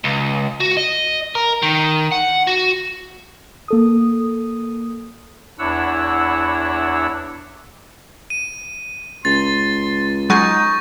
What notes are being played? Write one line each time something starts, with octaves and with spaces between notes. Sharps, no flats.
C#2
F#4
D#5
A#4
D#3
F#5
F#4
A#3 A4 D#6
E2 D4 E4 C#5 F#5 E6
D#7
C#2 C6 A6
F#3 G#3 D#4 G#5 C#6